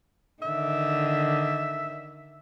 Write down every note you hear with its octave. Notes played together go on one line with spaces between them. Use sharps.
D3 D#3 E5